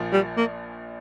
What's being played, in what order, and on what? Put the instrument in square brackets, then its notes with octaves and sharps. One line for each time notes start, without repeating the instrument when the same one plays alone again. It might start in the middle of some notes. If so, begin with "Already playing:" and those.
Already playing: [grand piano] A#1 A#2 F3
[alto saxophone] G3
A#3